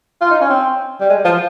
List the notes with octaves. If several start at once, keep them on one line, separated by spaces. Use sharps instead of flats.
F4
D#4
C#4
C4
G3
G#3
F3